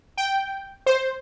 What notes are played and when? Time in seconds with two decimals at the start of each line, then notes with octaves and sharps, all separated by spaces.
0.17 G5
0.86 C5